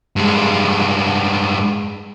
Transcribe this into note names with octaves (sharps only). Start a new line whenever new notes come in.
G2 G#3